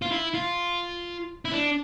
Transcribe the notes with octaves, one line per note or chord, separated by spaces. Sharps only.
F4
E4
F4
E4
D4